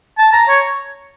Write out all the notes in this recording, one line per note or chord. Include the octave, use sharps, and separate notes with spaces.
A5
A#5
C#5